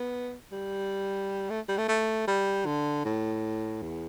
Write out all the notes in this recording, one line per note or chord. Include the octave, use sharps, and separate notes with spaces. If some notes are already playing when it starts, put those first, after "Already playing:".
Already playing: B3
G3
A3
G3
A3
A3
G3
D3
A2
E2